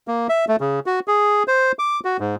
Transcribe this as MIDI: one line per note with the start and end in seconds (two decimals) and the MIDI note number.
0.08 0.27 58
0.29 0.45 76
0.48 0.56 57
0.61 0.80 49
0.86 1.00 66
1.08 1.43 68
1.48 1.72 72
1.79 2.00 86
2.05 2.17 66
2.20 2.35 44